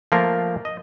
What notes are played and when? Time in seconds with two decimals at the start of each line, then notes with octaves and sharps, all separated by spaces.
0.12 F3 A3 A#3 F4 A#4
0.65 D#5